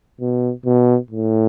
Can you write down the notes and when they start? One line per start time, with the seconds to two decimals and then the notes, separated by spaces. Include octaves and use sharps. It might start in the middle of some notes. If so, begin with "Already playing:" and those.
0.21 B2
0.66 B2
1.11 A2